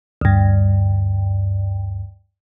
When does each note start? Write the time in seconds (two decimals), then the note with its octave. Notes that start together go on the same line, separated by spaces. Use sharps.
0.21 D2 G2